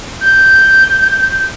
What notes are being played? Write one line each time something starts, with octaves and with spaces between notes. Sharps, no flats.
G6